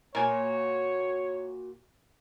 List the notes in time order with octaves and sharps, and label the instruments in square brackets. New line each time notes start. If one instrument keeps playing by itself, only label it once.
[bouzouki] A#2 F#4 [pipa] A#4 G#5 [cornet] C#5